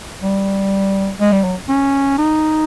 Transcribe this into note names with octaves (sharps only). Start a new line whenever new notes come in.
G3
G#3
G3
F#3
C#4
D#4